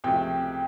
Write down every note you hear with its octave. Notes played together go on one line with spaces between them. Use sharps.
C#2 C3 F3 A3 G5